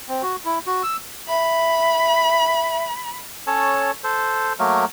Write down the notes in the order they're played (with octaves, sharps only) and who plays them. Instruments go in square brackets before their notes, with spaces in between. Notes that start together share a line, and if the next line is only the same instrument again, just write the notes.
[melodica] C4
F#4
E4
F#4
E6
[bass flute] E5 [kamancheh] B5
[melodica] C#4 A4 C#5 A5
A4 C5
F#3 A3 A#3 A#4